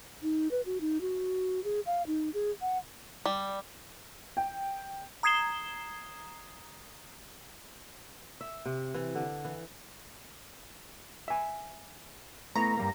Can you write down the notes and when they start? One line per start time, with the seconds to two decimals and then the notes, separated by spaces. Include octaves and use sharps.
0.23 D#4
0.51 B4
0.66 F#4
0.81 D#4
1.01 F#4
1.64 G#4
1.86 F5
2.07 D#4
2.34 G#4
2.62 F#5
3.26 G3
4.37 G5
5.23 A#5 D#6 G#6 C7 E7 G7
8.41 E5
8.66 C3
8.94 E3
9.15 D3
9.45 E3
11.28 E5 G#5
12.56 A3 B3 E4 A#5
12.77 G2 G3 A#3